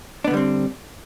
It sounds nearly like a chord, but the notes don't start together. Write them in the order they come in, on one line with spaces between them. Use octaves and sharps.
D4 B3 D3 G3 C4